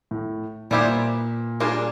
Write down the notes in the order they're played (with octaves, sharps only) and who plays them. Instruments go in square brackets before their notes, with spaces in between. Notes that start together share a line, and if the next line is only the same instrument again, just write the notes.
[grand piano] A2
[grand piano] A#2 [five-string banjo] G3 B3 E4 G4 C5
[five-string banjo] G3 A#3 D4 F4 G#4